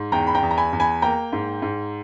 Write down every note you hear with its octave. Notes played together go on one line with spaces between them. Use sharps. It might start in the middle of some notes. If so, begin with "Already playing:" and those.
Already playing: G#2
E2 G5 A#5
B5
G5 A#5
E2
A#5
G#5 B5
E2
G#5 B5
A#3 G5 A#5
G#2
G#2